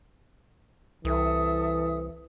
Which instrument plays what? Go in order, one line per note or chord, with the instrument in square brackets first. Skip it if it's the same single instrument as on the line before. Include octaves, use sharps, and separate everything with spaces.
[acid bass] C2 [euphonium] E3 [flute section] A4 E5 D#6